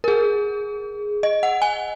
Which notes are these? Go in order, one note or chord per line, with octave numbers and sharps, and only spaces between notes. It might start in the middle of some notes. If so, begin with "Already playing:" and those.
A#4
G#4
D#5
F#5
G#5